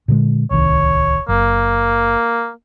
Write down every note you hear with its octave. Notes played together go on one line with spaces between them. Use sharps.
A#2 D3 G#3
D1 C2 D#3 C#5
F#1 A#3